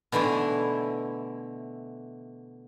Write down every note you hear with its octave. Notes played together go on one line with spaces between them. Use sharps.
B2 D3 E3 A3 E4